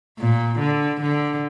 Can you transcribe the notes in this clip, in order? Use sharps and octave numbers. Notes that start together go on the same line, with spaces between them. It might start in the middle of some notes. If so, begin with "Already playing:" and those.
A#2
D3
D3